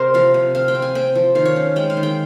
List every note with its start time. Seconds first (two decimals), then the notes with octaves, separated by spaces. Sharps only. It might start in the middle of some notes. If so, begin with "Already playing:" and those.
Already playing: C3 A#4 C5
0.14 F3 F5
0.34 C3
0.55 C4 F5
0.68 G5
0.75 C4
0.82 G#5
0.95 C4 G5
1.15 F3
1.35 D#3 F5
1.45 C#5
1.56 C#4
1.76 G#3 G5
1.90 F5
1.97 D#3
2.03 G5